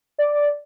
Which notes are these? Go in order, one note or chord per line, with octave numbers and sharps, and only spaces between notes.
D5